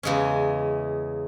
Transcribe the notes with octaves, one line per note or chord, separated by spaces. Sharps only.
E2 C#3 G#3 C#4